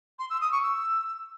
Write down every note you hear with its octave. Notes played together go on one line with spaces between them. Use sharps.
C6
E6
D#6
C#6
E6